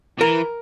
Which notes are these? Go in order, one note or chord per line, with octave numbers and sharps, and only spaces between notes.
E3 A#4